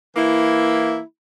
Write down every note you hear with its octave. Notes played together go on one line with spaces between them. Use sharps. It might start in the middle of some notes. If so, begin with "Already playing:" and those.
E3 A#3 E4